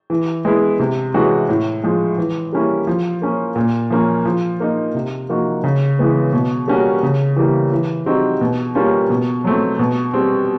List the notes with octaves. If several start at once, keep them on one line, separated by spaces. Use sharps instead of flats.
E3
G#3 B3 E4
C3
E3 G#3 C#4 F#4
A2
F3 G#3
E3
G3 A#3 C#4 E4
F3
A#3 C#4
A#2
F3 A#3 C#4
F3
A#3 D#4
C3
F3 A#3 D#4 F#4
C#3
E3 G#3 B3
B2
G3 A#3 C#4 F#4
C#3
E3 G3 A#3
E3
G3 C4 D#4 F#4
B2
G3 A#3 C#4 F4
B2
F#3 A3 C4
B2
G3 C4